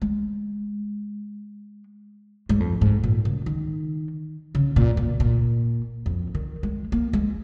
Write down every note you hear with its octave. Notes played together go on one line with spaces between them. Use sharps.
G#3
G#2
F2
G#2
A#2
C#3
D#3
C#3
A#2
A#2
A#2
F2
D#3
G#3
A#3
G#3